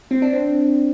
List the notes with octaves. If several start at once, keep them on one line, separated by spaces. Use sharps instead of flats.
C4
D4
C4